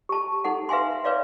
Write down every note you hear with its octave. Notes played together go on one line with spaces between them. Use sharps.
G4 A5
D#4 A4 F#5
B4 E5 F5 G#5 C6
B4 C#5 D5 F5